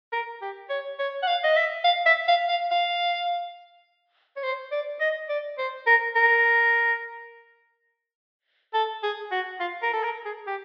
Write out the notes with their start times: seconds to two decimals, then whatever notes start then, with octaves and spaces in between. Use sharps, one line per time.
0.12 A#4
0.42 G4
0.70 C#5
0.99 C#5
1.23 F#5
1.27 F5
1.44 D#5
1.56 E5
1.84 F5
2.06 E5
2.28 F5
2.49 F5
2.71 F5
4.36 C#5
4.43 C5
4.71 D5
5.00 D#5
5.29 D5
5.58 C5
5.87 A#4
6.16 A#4
8.74 A4
9.03 G#4
9.32 F#4
9.60 F4
9.83 A#4
9.93 A4
10.04 A#4
10.25 G#4
10.47 G4